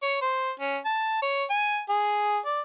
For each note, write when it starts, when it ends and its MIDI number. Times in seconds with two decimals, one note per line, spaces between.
0.03 0.20 73
0.22 0.51 72
0.60 0.77 61
0.85 1.20 81
1.22 1.44 73
1.50 1.79 80
1.89 2.39 68
2.46 2.61 74